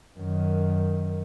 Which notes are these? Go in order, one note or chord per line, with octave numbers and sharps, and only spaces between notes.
F#2 D#3